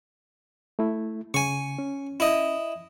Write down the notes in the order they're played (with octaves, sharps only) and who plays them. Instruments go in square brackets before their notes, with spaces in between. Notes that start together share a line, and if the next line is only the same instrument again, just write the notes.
[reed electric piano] A3 E4
[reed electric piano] C#3 [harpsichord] G#5 C#6
[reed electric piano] C#4
[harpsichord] E4 D#5